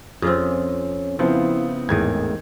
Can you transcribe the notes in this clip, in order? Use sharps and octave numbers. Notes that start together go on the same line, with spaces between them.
F2 C4 C#4 F4 G#4
C#3 F3 B3 C4 E4
G#1 E2 A2 D#3 G#4 G#6